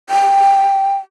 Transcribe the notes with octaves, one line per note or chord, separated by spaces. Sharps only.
G5